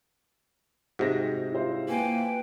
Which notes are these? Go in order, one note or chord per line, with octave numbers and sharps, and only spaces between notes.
G#2 C3 F#4 A#6
E4 F4 C5
A#3 B4 G5 G#5